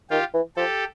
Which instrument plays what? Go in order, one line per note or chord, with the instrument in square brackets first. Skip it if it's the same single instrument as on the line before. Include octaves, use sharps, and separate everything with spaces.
[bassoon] D#3 [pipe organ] F4 G4
[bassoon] E3
[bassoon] F3 [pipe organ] G4 A4